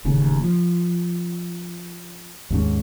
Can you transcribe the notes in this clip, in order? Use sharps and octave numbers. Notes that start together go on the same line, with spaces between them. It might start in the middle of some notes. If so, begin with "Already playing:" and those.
D#1 A1 D#2 C#3
F3
D#2 G#2 C#4